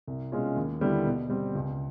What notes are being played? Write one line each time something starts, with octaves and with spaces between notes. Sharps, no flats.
C2
B2 G#3 C#4 F4
D#2
D3 G3 B3 E4
B2
G3 C4
C#2